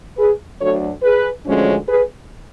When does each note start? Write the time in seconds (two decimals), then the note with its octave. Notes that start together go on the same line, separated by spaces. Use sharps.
0.18 G#4 B4
0.61 D2 D3 F#3 A3 A4 C#5
1.03 G#4 B4
1.46 D2 D3 F3 G#3 C#4
1.89 G#4 B4